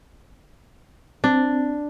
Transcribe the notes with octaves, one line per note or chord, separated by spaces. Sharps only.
C4 D4